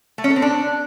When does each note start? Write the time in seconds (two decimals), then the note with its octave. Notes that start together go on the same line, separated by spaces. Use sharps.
0.18 A3
0.24 C#4
0.30 A4
0.36 C4
0.42 D4